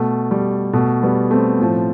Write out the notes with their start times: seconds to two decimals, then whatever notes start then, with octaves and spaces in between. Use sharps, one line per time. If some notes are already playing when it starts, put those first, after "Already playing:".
Already playing: B2 A3
0.31 G3
0.73 B2 A3
1.03 G3 B3
1.31 A3 C4
1.60 A2 F3